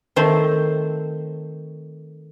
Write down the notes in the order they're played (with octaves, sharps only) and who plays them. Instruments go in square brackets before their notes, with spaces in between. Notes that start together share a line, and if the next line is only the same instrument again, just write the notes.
[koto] D#3 A3 C4 C5